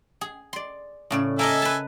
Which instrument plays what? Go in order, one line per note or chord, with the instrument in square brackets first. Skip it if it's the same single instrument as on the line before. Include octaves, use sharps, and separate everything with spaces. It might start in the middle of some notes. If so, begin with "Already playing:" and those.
[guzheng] G#4
D5 C6
A2 C#3 D5
[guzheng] A#3 A#4 D#5 [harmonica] A4 E5 G#5
[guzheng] B4 A5